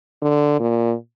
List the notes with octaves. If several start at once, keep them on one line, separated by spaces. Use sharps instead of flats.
D3
A#2